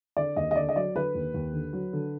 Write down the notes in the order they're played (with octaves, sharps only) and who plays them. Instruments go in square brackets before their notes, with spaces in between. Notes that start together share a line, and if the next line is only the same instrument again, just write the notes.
[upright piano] D3 D5
D#2 D#5
D#5
D3 D5
D#5
F#3 D5
D3 B4
D#2
D#2
D3
F#3
D3